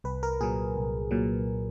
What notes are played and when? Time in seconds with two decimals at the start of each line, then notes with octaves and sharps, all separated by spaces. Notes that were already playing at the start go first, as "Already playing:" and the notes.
0.04 C2 B4
0.23 A#4
0.41 A#2 F#3 G#4
0.76 C2
1.11 A#2 F#3